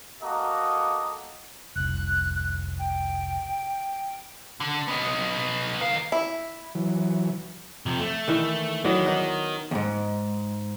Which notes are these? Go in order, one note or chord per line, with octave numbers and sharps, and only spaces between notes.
A#3 F#4 A4 D#5 A#5
F1 C2 F#6
G5
D3
B3 D#4
D#3 F5
E4
E3 F#3
C3 F3
A3
D#3 E3 E5
D#3 E3 F#3 D#5
B3 D#5
D#2 G#2